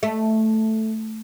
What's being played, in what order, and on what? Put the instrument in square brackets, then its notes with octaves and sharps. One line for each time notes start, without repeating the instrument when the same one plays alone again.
[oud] A3